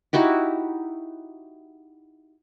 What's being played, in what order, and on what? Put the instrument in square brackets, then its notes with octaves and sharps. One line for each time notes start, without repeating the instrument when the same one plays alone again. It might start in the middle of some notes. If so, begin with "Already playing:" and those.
[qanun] D#4 E4 F#4 G4